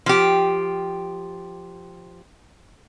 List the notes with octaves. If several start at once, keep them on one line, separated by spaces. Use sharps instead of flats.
F3 G4